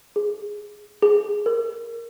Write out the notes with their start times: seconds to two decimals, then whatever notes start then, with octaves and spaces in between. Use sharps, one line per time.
0.16 G#4
1.02 G#4
1.46 A#4